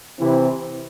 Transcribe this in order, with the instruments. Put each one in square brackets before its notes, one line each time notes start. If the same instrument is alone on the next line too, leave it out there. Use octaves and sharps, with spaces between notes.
[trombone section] C3 E3 C4 E4